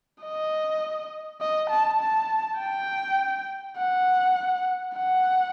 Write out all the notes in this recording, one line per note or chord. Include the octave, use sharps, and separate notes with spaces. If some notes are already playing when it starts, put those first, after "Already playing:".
D#5
D#5
A5
A5
G5
F#5
F#5